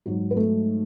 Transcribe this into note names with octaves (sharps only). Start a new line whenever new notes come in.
G#2 F#3 F#4
B4
A3 A4